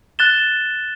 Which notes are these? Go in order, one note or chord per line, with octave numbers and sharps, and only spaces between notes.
F#6 A6 E7 G7